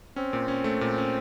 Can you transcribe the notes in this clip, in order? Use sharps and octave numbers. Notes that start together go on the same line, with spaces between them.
C4 C#4
A#2
C#4
A3
A#2
C#4